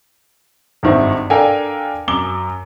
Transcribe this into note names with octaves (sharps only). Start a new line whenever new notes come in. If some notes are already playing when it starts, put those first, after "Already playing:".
G#1 G2 D#3 C5 E5
D4 A4 A#4 F5 G5 G#5
F#2 D6 G7